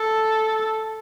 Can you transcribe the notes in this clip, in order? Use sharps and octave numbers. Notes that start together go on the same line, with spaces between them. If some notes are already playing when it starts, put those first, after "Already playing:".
Already playing: A4